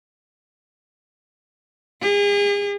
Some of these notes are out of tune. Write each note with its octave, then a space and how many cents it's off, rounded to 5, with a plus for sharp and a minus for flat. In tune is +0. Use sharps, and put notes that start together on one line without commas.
G#4 -40